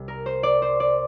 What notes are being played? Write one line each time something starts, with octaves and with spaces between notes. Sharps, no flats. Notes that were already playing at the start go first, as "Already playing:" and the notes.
Already playing: C2 C3 G3
A#4
C5
D5
C5
D5